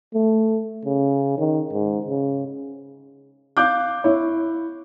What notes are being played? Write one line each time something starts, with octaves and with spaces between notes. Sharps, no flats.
A3
C#3
D#3
G#2
C#3
F5 D6 F#6 G6
E4 C#5